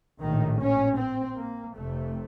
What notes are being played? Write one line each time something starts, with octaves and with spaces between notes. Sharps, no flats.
A#1 A2 D#3
C#4
C4
A#3
F1 F2 C3 A3